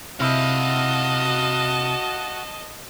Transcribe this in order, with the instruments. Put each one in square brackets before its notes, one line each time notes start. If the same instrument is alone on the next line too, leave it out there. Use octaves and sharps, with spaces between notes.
[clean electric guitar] C3 E4 [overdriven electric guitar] F#4 F5 [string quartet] D#5 A5